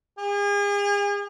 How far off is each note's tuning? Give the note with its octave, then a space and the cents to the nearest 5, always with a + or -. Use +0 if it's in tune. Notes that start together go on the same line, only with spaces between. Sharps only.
G#4 -40